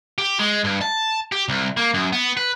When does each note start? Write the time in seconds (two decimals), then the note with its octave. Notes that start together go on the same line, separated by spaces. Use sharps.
0.18 G4
0.39 G#3
0.64 G2
0.81 A5
1.32 G4
1.49 C2
1.77 A#3
1.94 F#2
2.13 B3
2.37 B4